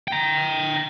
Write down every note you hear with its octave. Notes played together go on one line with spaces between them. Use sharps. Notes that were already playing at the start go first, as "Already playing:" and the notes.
G5 A#5